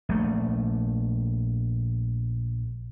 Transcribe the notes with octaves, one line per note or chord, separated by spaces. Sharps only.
A#1 A3